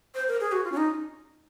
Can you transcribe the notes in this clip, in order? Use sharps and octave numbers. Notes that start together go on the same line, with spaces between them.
C5
A#4
G#4
F#4
F4
C#4
D#4